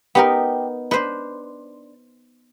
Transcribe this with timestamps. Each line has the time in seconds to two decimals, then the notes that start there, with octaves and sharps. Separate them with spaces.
0.15 B3 D#4 G4 A#4
0.91 D4 D#4 B4 C5